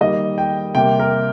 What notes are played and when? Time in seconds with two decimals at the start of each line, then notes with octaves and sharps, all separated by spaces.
0.01 D#3 G3 A#3 D#5
0.38 G5
0.75 C3 G3 A#3 G5
1.00 A#4